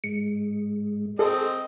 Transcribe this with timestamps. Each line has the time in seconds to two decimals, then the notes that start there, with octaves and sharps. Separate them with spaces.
0.04 G#2 G#3 C#7
1.19 C4 G#4 A4 D#5